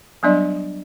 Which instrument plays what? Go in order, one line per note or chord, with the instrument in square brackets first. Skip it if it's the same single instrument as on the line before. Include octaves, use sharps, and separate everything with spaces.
[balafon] F#3 G3 B3 D4 D5 D#5